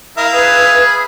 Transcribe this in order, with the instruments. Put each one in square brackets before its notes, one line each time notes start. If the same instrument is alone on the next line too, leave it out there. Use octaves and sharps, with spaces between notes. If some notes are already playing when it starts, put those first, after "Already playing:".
[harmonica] E4 E5 F5 [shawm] A#4
[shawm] G#4 [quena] B4
[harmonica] B5